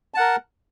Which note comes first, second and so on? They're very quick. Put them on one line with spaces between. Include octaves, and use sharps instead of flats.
A5 F#5 A#4